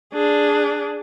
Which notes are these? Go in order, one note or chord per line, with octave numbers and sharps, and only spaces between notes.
D4 G#4